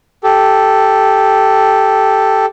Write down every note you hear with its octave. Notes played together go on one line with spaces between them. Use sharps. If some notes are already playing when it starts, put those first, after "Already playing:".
G4 A4